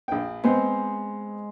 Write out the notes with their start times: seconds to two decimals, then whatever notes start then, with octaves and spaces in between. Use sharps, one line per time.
0.08 A#1 G5
0.44 G#3 B3 C4 C5